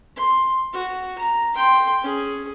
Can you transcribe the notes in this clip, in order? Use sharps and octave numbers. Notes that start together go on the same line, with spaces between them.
C6
F#4
A#5
G5 C6
C#4 G#4